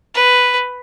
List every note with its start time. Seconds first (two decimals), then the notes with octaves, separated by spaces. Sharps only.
0.14 B4